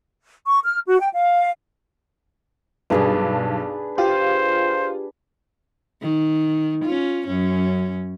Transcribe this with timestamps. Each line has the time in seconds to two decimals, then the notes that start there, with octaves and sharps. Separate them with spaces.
0.46 C#6
0.64 F6
0.87 F#4
1.01 G5
1.13 F5
2.90 B1 G2 D4 G#4 B4
3.98 F4 G4 C5
6.02 D#3
6.85 C#4 F4
7.27 F#2 C#4